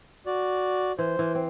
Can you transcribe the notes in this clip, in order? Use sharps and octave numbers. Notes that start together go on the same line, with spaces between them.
F#4 D5
E3 C5
E3
C4